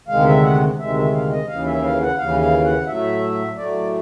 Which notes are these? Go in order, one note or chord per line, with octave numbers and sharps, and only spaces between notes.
D2 C3 D#3 G#3 F5
E5
F#5
D2 C3 D#3 G#3 E5
E5
F5
D#5
D#2 C#3 E3 F5
E5
F5
F#5
D#2 C#3 E3 F5
F5
F#5
A2 F#3 A3 E5
A2 F#3 A3 D5